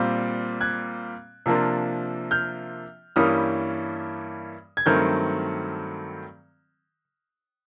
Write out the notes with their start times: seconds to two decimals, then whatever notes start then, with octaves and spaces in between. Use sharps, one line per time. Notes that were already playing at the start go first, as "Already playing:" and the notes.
Already playing: A#2 G3 C4 F4
0.61 F#6 G#6
1.46 C3 F3 A#3 D4 F4
2.31 F6 G6
3.16 G2 E3 G3 A#3 C#4 D#6 F6
4.77 G#6
4.86 G2 D#3 F#3 A3 C4 F6 G6